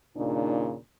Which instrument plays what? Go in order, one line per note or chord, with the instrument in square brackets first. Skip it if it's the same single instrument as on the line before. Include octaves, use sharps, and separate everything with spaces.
[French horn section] D#2 A#2 C#3 D4 D#4